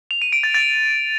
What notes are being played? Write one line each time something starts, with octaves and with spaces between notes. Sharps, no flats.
F7
D#7
D7
A6
A6